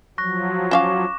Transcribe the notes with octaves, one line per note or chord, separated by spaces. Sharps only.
F3 F#3 C#6 F#6 A#6
C#4 E5 F5 C#6 D6 E7